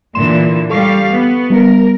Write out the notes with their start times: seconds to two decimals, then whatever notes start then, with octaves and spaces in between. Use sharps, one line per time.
0.15 A#2 D3 E3 C6 E7
0.70 G3 G4 A4 F5 C#6
1.12 B3
1.50 G3 B3 A#4